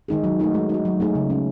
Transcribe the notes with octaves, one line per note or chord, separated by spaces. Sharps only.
D#3 G#3 D#4 G#4
F#3
A3 D#4 F#4
G#3
D#4 F#4
F#3
A3 D#4 G#4
C#3
G#3 C#4